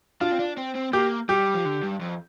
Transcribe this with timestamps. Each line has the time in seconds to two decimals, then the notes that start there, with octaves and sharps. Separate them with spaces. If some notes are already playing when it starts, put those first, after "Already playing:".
0.21 D4 F4
0.32 C4
0.39 D4
0.57 C4
0.75 C4
0.93 A#3 G4
1.29 G3 G4
1.54 F3
1.65 D3
1.82 G2
2.01 F2